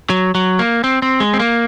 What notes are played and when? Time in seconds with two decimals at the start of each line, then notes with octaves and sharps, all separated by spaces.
0.10 F#3
0.35 F#3
0.59 A#3
0.84 C4
1.02 C4
1.20 G#3
1.34 C4
1.40 A#3